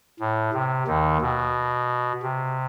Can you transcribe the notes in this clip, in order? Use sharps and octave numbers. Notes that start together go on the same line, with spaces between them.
A2
C3
D#2 D#3
B2
C3